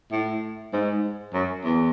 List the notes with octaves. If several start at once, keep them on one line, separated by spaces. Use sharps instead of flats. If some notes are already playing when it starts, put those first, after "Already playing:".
A2
G#2
F#2
E2